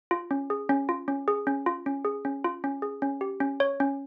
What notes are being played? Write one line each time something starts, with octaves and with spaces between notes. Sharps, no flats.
F4
C#4
G#4
C#4
F4
C#4
G#4
C#4
F4
C#4
G#4
C#4
F4
C#4
G#4
C#4
G4
C#4
C#5
C#4